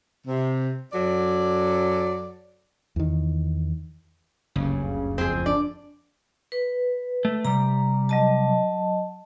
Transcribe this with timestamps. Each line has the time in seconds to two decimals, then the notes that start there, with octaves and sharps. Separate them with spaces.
0.26 C3
0.93 F#2 F#3 A4 D5
2.96 E2 D#3
4.56 F#1 D2 G2 C#3
5.18 F2 C4 G#4
5.46 D4 D5
6.52 B4
7.25 A3
7.45 C3 G3 A#5
8.09 F#3 D#5 A5